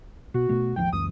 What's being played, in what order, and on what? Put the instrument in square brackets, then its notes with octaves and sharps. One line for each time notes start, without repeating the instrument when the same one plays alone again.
[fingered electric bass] B2 [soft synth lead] F#4
[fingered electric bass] B2 A3
[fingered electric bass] G#1 D#2 F3 [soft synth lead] G5
[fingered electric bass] C#2 F#2 E3 [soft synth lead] D#6